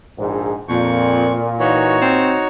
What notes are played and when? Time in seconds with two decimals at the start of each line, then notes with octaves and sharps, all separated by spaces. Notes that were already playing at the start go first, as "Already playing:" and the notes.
0.17 A#1 G#2
0.69 F2 A#2 C#6
1.60 E3 D#4 F#4 C#5
2.01 C4